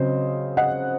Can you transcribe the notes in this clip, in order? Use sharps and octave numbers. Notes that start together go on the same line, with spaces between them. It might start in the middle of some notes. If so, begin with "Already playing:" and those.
Already playing: C#3 F#3 C4 C5 D#5
D#5 F#5